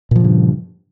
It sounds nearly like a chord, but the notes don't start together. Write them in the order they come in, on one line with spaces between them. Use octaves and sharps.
A#2 F3 C#3 G2